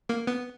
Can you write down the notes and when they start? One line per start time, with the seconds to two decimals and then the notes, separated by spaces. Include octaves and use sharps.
0.09 A#3
0.27 B3